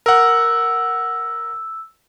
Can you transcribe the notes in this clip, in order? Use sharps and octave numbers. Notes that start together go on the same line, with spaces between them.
A#4 F#5 E6